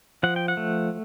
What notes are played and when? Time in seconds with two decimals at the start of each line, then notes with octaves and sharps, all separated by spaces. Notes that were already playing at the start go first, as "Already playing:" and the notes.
0.23 F3 F#5
0.36 G5
0.48 F#5
0.57 A3